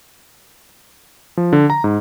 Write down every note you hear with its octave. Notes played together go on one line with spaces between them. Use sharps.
F3
D3
A#5
G#2